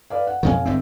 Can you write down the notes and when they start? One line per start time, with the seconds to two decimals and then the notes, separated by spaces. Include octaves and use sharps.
0.10 B4 D5 F5
0.27 F#5
0.43 F2 B2 D#3 C#5 F5 G#5
0.65 G1 G2 C4 E5